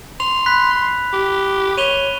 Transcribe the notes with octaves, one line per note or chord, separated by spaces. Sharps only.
C6 F7
B5 F#6 B6
G4
C#5 D#7 F7 G7